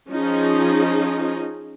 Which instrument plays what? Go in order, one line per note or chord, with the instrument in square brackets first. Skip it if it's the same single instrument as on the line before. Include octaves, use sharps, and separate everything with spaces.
[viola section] F3 C#4 D#4 G#4